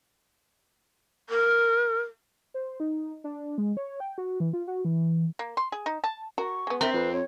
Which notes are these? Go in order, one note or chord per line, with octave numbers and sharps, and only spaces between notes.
A#4
C5
D#4
D4
G#3
C#5
G5
F#4
E3
F4
F#4
E3
A#3
C6
G#4
D#4
A5
F#4 A#4 C#6
G#3 B3
C4 A#4 E5
F2 B4
C#5